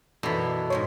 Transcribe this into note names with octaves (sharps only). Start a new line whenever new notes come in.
F#2 B2 E3 D4 A4 C5
G#2 F3 G#3 C#5